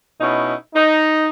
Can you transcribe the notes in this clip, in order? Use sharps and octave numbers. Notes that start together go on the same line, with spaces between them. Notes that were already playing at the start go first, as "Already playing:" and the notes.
B2 C#4 D#4 E4
D#4